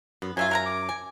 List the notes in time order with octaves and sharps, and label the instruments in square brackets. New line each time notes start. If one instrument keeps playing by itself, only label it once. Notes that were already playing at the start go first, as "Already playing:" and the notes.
[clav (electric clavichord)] F#2 [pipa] B3
[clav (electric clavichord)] F#2 E5 [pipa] F#3 A3 F4 [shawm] G#5
[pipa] A#4 F#5 A#5
[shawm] D6
[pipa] G#5